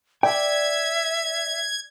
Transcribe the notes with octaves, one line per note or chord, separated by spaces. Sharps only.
D5 E5 G5 G#6